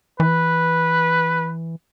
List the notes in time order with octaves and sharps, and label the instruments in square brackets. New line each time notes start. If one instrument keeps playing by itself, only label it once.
[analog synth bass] E3 [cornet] B4